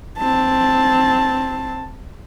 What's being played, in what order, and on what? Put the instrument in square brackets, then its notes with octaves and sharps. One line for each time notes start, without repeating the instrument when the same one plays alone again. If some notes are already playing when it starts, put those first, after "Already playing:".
[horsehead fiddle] C4 A5